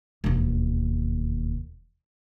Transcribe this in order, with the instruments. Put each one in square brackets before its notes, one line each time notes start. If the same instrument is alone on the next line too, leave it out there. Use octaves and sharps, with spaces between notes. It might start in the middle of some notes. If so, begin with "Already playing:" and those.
[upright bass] E1 D#2